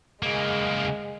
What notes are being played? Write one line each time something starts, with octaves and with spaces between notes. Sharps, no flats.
C#3 G#3 A#3